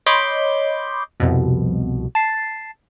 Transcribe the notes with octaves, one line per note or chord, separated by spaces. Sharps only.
C#5 D#5 B5 C6 D6 G6
C2 F2 B2
A5 C7